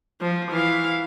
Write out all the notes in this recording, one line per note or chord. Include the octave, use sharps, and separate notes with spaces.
F3
E3 F5